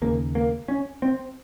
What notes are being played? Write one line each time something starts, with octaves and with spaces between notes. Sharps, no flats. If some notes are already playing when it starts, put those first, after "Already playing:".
D#2 C#3 A#3
A#3
C#4
C4